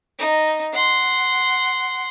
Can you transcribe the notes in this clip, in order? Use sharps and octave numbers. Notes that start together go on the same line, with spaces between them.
D#4
F#5 C6